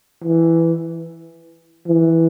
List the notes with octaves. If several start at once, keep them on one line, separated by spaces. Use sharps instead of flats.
E3
E3